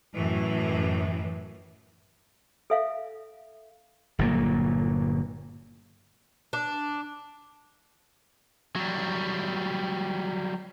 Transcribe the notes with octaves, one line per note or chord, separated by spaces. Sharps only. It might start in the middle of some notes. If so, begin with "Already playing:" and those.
F#2 A2 E3
A4 E5 F5
G1 A#2 F#3 A#3
D4
F#3 G3